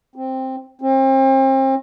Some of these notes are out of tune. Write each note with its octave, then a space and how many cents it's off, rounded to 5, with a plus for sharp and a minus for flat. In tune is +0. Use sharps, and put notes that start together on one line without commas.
C4 +5
C4 +35